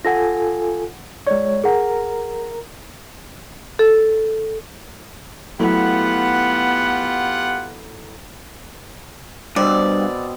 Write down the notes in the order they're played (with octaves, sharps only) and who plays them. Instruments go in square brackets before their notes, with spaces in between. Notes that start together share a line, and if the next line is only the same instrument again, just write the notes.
[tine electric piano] F4 A4 G#5 [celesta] F#5 A#6
[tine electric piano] G#3 C#5 [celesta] D5
[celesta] G#4 F#5 [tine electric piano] A#4 A#5
[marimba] A4
[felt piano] F#3 A3 E4 [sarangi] B3 [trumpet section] F4 G4 F#5
[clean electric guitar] G2 [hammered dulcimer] B2 B3 C4 [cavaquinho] D5